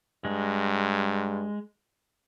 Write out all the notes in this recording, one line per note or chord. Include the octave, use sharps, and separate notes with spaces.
G2 G#3